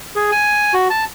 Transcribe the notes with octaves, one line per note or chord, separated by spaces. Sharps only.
G#4
G#5
F#4
A5